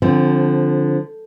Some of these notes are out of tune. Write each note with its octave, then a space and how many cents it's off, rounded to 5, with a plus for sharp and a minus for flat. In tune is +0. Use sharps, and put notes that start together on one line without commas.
D3 +0 F3 +0 C4 +20